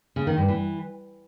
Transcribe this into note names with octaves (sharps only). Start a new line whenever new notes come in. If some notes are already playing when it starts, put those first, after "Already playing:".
C#3
D#3
G2
E3